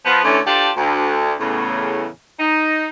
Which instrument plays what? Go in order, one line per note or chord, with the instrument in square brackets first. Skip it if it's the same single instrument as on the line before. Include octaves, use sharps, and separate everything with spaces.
[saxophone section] F3 B3
D3 E3 A3 C#4
D4 F4 G4 A4 C5 D5
D2
E2 A2 C#3
D#4